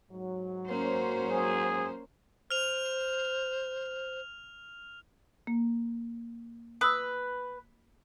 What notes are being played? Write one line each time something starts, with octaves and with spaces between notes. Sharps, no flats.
G#2 F#3
A#3 C#4 C5
G#4
C5 F6 F7
A#3
B4 D#6 E6